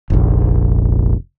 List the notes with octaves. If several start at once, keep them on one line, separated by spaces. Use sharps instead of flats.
F1 A#1